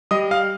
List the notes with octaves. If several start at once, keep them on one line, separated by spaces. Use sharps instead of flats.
G3 D#5 D#6
F5 F6